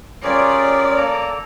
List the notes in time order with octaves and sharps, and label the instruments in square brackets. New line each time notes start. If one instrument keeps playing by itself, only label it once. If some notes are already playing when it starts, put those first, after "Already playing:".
[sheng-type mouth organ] C#4 A#4 C#5 [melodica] F4 G4 G#4 [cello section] D5
[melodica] A#3 A4 A#5